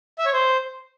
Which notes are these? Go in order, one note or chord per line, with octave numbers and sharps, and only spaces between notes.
E5
C#5
C5